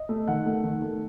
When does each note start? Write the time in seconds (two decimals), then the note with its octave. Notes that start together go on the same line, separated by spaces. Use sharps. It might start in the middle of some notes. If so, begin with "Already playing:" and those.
Already playing: D#5
0.09 A3
0.28 D#3 F#5
0.46 A3
0.64 D#3
0.82 A3